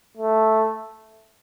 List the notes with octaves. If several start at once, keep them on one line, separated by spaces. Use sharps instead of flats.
A3